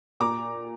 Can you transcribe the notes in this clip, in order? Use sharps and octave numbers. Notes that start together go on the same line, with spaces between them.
A#2 A#5 D6